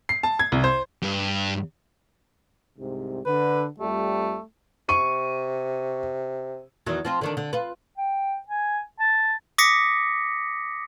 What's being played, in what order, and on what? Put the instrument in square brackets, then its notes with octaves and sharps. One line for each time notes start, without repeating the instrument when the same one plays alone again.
[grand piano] C7
A5
G#6
C2
C5
[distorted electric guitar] G2
[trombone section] C2 G#2 C3
[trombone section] D3 [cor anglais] B4
[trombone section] F2 G3 [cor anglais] A3
[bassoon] C3 [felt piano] C#6 D#7
[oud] E2 D#3 F#3
F3 C4 F4
D3 D#3 D4
D3
F4 B4
[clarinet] G5
G#5
A5
[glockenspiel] D6 D#6 A#6 B6 C#7